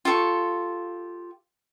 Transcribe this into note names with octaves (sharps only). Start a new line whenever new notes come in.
F4 G4 A4 C#6